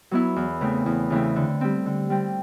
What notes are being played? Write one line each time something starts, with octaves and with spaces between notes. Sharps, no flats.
F#3 B3 E4
E2
C#3 E3 A3 C4
E2
C#3 E3 A3 C4
D3
G3 C4
D3
G3 C4